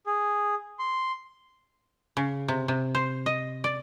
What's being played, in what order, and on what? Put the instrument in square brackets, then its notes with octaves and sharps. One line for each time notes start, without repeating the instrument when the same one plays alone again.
[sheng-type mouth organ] G#4
C6
[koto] C#3
C3
C3
C5
D#5
D5